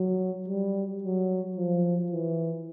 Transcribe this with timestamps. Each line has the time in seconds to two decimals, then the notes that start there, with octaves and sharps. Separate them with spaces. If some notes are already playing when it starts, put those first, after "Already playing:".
Already playing: F#3
0.48 G3
1.03 F#3
1.57 F3
2.12 E3